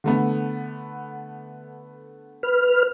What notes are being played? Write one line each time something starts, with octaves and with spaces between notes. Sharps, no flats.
D3 A3 B3
B4 F6